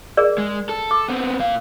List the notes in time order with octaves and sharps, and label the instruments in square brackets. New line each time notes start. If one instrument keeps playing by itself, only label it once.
[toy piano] G#4 A#4 D5
[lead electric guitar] G#3
A4
[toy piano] D6
[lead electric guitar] B3 C4
A#2 F5